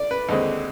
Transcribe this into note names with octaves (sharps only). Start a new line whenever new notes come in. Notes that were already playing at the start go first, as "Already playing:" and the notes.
Already playing: D5
B4
D#2 D3 G#3 C4